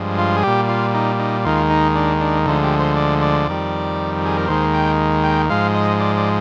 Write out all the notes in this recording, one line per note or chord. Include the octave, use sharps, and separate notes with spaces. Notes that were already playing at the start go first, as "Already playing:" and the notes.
Already playing: G2 F3 G#3
F4
G#4
A#2 G3 G4
F4
D#4
D#4
D#2 D#3 G#3 F4
D#4
D4
D4
D2 D3 F3 G#3 D#4
G4
C5
D5
D5
F2 D#3 G3
G#4
A#4
D#2 D#3 G#3 C5
G5
G5
G#2 F3 G#3 F5
D#5
D5
D5